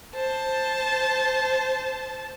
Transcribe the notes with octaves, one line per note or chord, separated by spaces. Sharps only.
C5 A5